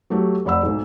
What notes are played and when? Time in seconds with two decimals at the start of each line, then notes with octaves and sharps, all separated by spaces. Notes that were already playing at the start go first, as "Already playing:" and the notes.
0.10 F#3 A3 G4
0.45 F1 D5 F#5 B5 E6
0.63 B1 G#2